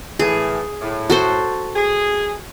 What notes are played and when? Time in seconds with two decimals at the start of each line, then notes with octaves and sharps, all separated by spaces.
0.19 A2 E3 G#4
0.82 A2
1.10 F#4 A4 C5
1.76 G#4